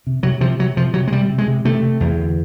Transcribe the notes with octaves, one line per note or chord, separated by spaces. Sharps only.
C3
C3 F#3
C3 F3
C3 F#3
C3 F3
C3 F#3
G#3
C3 G3
C3
G#3
C3
C3 A3
C3
E2
D2